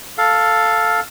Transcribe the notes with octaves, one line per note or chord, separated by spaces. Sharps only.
A4 F5